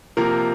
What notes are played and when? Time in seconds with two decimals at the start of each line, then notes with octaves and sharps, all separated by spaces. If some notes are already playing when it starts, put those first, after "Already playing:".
0.17 C3 F3 A#3 A#4